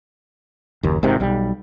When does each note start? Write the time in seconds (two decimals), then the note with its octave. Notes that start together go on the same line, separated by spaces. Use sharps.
0.83 F#1 D#2
1.03 G#1 G#2 C3 D#3
1.20 B1 G3